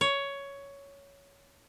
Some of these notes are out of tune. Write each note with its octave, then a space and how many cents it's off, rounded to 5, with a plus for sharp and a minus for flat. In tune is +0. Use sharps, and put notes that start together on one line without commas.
C#5 +10